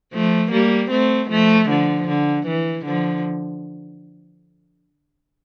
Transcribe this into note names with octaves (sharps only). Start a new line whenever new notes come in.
F3 A3
G3 A#3
A3 C4
F3 A3
D3 F3
D3
E3
D3 F3